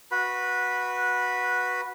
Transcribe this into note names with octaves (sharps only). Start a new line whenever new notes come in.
F#4 B4 B5